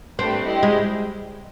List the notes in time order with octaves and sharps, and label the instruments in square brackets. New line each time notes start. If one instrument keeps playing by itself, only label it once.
[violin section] A3 D4 G4 B4 [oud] C4
[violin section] E4 G4 C5 D#5 G5
[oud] G#3